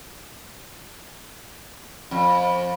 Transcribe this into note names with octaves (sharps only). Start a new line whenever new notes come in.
F2